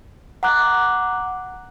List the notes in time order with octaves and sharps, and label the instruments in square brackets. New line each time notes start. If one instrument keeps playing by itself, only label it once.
[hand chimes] F#5 A#5 D6 F#6